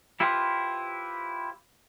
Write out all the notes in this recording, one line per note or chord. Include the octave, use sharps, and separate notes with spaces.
E4 F4 G4 B4 C5 F5